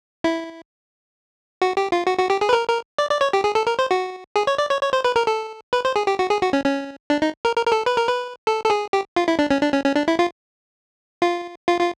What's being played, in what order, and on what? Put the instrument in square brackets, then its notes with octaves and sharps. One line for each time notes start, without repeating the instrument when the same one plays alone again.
[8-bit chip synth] E4
F#4
G4
F4
F#4
F#4
G4
G#4
B4
A#4
A#4
D5
D5
C#5
G4
G#4
A4
A#4
C5
F#4
G#4
C#5
D5
C#5
C#5
C5
B4
A#4
A4
B4
C5
G#4
G4
F#4
G#4
F#4
C#4
C#4
D4
D#4
A#4
A#4
A#4
A4
B4
A#4
B4
A4
A4
G#4
G4
F4
E4
D4
C#4
D4
C#4
C#4
D4
E4
F4
F4
F4
F4